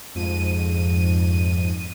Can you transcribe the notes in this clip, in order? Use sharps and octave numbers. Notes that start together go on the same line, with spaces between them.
F2 G#2 D#7